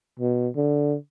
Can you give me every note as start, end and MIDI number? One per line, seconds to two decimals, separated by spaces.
0.20 0.48 47
0.56 0.96 50